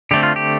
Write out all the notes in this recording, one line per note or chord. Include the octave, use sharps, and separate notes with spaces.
D3 A3 C4 G4
F4
G4